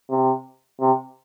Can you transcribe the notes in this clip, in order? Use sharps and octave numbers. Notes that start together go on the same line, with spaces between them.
C3
C3